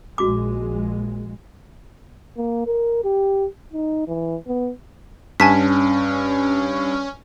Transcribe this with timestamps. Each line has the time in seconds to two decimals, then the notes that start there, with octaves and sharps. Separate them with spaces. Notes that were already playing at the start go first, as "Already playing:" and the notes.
0.18 A#1 G#3 F#4 D6
2.37 A#3
2.67 A#4
3.04 G4
3.73 D#4
4.08 E3
4.48 B3
5.40 G2 C#4 G#5 A5 B6